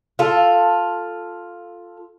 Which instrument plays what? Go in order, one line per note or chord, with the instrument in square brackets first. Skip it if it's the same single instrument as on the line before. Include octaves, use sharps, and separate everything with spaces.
[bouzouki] F4 A4